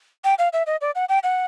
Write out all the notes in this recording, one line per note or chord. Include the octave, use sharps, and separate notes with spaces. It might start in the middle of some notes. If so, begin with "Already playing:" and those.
G5
F5
E5
D#5
D5
F#5
G5
F#5